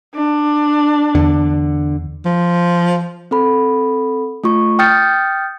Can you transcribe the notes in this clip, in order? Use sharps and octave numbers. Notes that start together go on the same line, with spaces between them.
D4
E2 D3
F3
C4 A4 B5
A3 F4 C#6
G5 D#6 F6 G6 A6 C#7